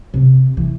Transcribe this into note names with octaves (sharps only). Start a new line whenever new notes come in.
C3
E3